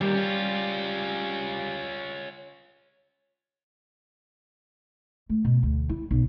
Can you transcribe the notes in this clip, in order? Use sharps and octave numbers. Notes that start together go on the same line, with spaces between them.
D#2 A#2 G3
C#4 F4
A3
B2
D2
E4
B1